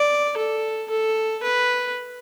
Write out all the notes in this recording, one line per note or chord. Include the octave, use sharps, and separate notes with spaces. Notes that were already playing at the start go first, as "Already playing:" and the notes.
Already playing: D5
A4
A4
B4